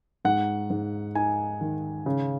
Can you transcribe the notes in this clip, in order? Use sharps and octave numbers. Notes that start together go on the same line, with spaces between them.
G#2 F#5
G#2
D#4 G#5
D#3
C#3